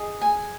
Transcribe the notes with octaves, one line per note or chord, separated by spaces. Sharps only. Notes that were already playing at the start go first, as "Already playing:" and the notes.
Already playing: G#4 D#5
G#5